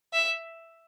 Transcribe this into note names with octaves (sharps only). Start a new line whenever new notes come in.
E5